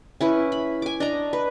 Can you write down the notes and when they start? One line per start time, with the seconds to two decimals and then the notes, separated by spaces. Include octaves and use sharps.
0.21 C#4 E4 B4
0.52 B5
0.82 G#5 D6
1.00 D4 D#5 A#5
1.33 B4